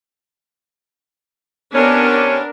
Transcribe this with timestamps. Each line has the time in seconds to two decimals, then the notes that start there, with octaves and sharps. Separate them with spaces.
1.74 C3 B3 C#4 D4 A#4